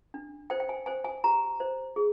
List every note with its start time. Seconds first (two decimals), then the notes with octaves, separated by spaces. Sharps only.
0.14 D4
0.50 C5 G5
0.60 G5
0.69 G#5
0.86 C5 G#5
1.04 G#5
1.24 G4 A#5
1.60 C5
1.96 G#4